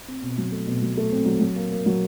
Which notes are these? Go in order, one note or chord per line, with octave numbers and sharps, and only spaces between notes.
C4
B2
F#3
A3
B2
F#3
A3
C4
F#3
F#3
A#3
A#3
F#3